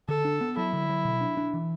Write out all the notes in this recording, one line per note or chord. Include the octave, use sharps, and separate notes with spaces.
D3 A4
D4
B3
F#3 E4
D3
F#3
B2
D4
D4
E3